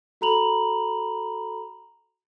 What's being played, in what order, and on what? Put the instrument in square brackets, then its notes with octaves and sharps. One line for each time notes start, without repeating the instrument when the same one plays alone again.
[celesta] F#4 A4 A#5 B5 F7 F#7